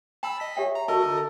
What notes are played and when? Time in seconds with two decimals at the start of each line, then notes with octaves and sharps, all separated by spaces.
0.23 G5 A5 B5 E6
0.40 D#5 B6
0.57 G4 C#5 E5 G5
0.75 A#5
0.88 F#4 A4 A#4 D#5
1.05 D3